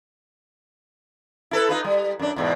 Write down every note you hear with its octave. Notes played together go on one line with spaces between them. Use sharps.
E4 A4 B4
D#4 F4 B4
G3
F#2 D4
E2 G#2 B2